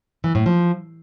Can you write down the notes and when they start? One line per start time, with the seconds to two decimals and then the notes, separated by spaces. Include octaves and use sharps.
0.24 E3
0.35 A2
0.46 F3